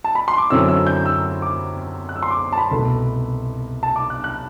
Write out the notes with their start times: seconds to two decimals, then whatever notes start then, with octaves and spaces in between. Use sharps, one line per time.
0.04 A5
0.15 B5
0.28 C6
0.38 D6
0.50 F#2 D3 F#3 C4 E4 E6
0.69 E6
0.87 G6
1.06 E6
1.42 D6
2.09 F#6
2.16 E6
2.23 C6
2.31 D6
2.52 A5
2.58 B5
2.71 C2 B2 A3
3.83 A5
3.96 D6
4.10 F#6
4.24 F#6